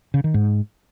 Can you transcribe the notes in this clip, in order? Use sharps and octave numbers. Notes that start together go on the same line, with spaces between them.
C#3
D#3
G#2